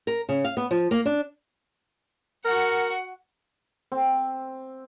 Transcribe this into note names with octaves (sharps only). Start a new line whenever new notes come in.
A#4
C#3
F5
B3
F3
A#3
D4
F#4 A#4 F#5
C4